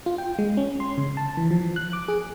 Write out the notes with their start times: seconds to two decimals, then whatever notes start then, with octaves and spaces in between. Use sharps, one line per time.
0.06 F4
0.18 G5
0.39 G#3
0.57 C#4
0.80 C6
0.98 C#3
1.17 A5
1.37 E3
1.51 F3
1.76 F#6
1.93 D6
2.08 G#4